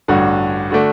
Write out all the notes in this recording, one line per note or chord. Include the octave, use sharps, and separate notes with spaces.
A1 G2 D3 F#4
D3 A3 D4 F#4